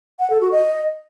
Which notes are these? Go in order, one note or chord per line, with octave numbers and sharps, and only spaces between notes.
F#5
A4
F#4
D#5